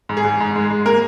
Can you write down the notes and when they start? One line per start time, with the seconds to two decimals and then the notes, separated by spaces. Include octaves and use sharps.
0.09 G#2
0.17 G#4
0.24 G#2
0.40 G#2
0.55 G#3
0.70 G#3
0.86 A#3 A#4